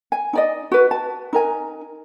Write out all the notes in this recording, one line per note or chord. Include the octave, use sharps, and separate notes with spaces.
G#5
D#4 D5 D#5
F#4 B4
A5
D#4 A#4 G#5